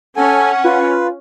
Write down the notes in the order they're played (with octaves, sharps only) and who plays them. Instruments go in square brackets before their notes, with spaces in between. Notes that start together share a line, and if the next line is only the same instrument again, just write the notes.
[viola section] C#4 [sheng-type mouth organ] A4 G#5 [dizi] F#5
[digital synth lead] F4 [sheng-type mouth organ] B4